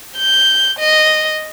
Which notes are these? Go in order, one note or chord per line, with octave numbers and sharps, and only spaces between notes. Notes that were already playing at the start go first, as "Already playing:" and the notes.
G6
D#5